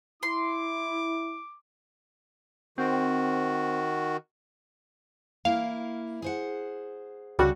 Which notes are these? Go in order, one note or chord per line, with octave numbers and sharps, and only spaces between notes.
E4 C6 D6
D#3 C4 F#4
A#3 E4 F5
G#4 C5 F#5
C#2 C#3 G3 D4 F#4 A4